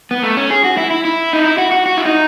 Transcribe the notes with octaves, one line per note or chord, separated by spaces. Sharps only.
B3
A3
C#4
G#4
F#4
E4
E4
E4
D#4
E4
F#4
F#4
F#4
E4
D#4